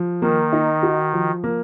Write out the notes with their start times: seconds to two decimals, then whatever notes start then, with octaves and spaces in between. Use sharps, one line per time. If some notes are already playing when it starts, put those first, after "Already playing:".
Already playing: F3
0.21 D#3 A#3
0.53 D#4
0.83 F#4
1.13 F3
1.44 A#3